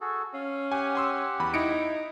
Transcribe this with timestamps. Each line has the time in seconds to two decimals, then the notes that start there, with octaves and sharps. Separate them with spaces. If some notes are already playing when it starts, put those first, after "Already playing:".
0.01 F#4 G#4 A4
0.34 C#4 F5
0.72 G4 F#5 G#5
0.95 G#5 C6 E6
1.40 E2 B5
1.54 D#4 E4 C#7 D7